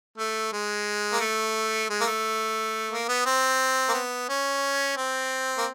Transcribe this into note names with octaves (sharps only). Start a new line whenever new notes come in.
A3
G#3
A#3
A3
G#3
A#3
A3
A#3
B3
C4
A#3
B3
C#4
C4
A#3